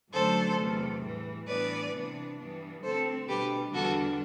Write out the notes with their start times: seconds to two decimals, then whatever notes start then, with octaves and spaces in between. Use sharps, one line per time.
0.12 F#2 D3 F#3 A3 D4 A4 C5
0.58 E2 C3 F#3 A3
1.02 A2 E3 G3
1.47 A2 E3 G3 B3 D4 B4 D5
1.92 C3 E3 B3 D4
2.38 G2 E3 G3 B3 D4
2.83 D2 D3 A3 C4 A4 C5
3.28 B2 G3 D4 G4 B4
3.73 E2 D3 G3 D4 F#4 A4